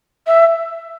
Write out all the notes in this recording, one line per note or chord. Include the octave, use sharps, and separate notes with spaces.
E5